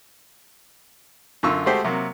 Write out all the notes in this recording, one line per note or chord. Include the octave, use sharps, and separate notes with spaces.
F#2 D3 F4 C#6 E6
G#3 A3 F#4 G4 C5 E5
C3 F#3 A#3